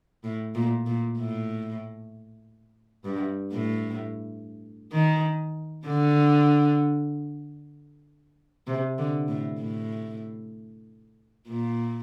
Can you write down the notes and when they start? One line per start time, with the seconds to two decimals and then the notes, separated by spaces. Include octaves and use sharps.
0.24 A2
0.55 A#2
0.86 A#2
1.18 A2
3.04 G2
3.52 A2
4.92 D#3
5.86 D3
8.67 C3
8.98 D3
9.28 A2
9.60 A2
11.48 A#2